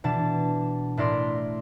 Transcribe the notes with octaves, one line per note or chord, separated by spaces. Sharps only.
B2 E3 D4 A5
A2 E4 A#4 D5 C6